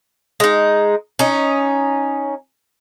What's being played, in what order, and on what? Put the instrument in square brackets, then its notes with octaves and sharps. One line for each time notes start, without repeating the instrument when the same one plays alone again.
[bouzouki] G#3 D#4
C#4 D#4